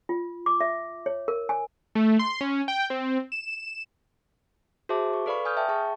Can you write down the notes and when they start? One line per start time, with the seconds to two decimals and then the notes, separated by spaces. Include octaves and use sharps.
0.09 F4
0.46 D6
0.61 E5
1.06 C#5
1.28 A#4
1.49 G#5
1.95 A3
2.19 C6
2.41 C#4
2.68 G5
2.90 C4
3.32 E7
4.89 F#4 G#4 C5 E5 A5 D6
5.13 C#6
5.26 A4 B4 D5 F5 B5 C#6
5.45 G#5 D#6 F6 G6
5.57 E5 G5 A5
5.68 G#4 A5 C#6